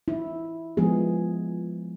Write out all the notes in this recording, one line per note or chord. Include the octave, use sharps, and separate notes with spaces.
E4
F3 G#3 B3 G#4